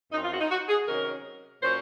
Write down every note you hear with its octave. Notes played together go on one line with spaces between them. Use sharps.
F#2 F3 C4 D#4
F4
F#4
D#4
F#4
G#4
C3 D#3 F#3 C#4 A#4
A#2 F#3 C#4 C5